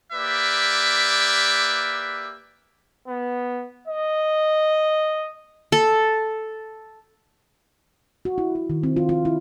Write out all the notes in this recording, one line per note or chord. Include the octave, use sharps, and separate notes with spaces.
A#3 G4 B4 D5 E5
B3
D#5
A4
F#4
E4
F#4
D#3
C4
F4
F4
E4